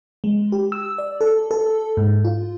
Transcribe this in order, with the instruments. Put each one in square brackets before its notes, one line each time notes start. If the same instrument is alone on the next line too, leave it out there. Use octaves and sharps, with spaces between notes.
[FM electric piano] G#3
G4
E6
D5
A4
A4
G#2
F4